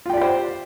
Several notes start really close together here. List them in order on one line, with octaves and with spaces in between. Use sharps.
F4 G5 D5 G4 C5